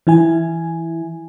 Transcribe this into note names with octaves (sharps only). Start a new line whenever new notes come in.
E3 E4 G#5